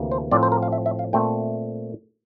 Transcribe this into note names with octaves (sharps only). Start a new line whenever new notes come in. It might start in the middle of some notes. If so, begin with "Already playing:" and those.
Already playing: D2 C3 E3 A#3
C5
A2 F3 C4 D5
C5
A#4
F5
E5
E5
F5
A#2 A3 C4 G5